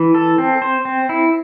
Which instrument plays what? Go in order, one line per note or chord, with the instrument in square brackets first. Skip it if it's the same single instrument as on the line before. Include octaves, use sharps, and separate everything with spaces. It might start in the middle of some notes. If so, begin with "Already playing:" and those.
Already playing: [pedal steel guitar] E3
A4
C4
C5
C4
E4